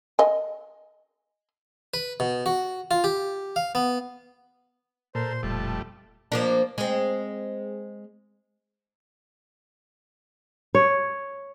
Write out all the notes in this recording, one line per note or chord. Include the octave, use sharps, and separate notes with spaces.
D#5 G#5
B4
B2
F#4
F4
G4
F5
B3
A#2 A4 A#4 C5 C6
E1 F2 G3 A3 A5
F3 A#3 D4
G#3 C4
C#5